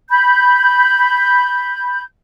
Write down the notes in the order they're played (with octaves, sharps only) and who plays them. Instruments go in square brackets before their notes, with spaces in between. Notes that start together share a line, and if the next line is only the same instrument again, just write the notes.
[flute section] B5 G6